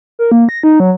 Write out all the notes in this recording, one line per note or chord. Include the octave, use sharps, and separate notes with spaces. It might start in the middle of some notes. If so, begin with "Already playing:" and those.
A#4
A#3
A#6
D#4
F#3